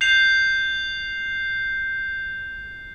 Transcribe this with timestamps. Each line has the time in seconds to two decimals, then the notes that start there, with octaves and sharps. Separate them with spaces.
0.01 G6 C7 F7